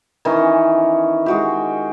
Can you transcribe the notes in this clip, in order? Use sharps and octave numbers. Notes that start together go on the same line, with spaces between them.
D#3 E3 C#4
G#3 F#4 G4